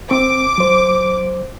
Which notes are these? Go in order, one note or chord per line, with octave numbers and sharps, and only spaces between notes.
C4 D6
F#3 C5